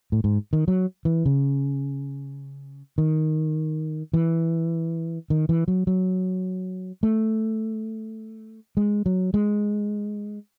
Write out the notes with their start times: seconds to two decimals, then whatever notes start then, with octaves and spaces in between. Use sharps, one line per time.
0.12 A2
0.24 G#2
0.53 D#3
0.68 F#3
1.05 E3
1.26 C#3
2.98 D#3
4.14 E3
5.30 D#3
5.49 E3
5.68 F#3
5.87 F#3
7.03 A3
8.77 G#3
9.06 F#3
9.34 G#3